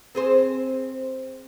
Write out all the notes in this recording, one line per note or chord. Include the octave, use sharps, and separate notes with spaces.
C4 G#4 C5